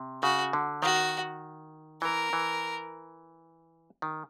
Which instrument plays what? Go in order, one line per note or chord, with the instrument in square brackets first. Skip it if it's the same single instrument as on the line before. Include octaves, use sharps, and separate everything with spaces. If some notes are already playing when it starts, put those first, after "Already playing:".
Already playing: [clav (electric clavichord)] C3
[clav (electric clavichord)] C#3 [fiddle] F#4
[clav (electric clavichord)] D3
[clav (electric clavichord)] D#3 [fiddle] F#4
[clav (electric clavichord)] E3 [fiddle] A#4
[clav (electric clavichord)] E3
D#3